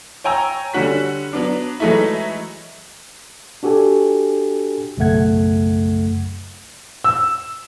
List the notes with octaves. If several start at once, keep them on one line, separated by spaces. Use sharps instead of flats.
C#5 G5 G#5 A#5 E6
D3 G3 C#4 F#4 B6
F#3 B3 D4
E3 F#3 G#3 A3 D#4 E4
D4 F#4 G4 A4 G#5
B1 F#2 C#3 A3 F#5 G#6
E6